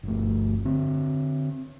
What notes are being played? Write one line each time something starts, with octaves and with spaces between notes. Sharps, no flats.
G1 A3
D3 C4